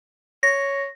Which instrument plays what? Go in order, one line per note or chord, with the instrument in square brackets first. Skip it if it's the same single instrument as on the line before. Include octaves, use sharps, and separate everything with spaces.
[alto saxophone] C#5 [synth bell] A#6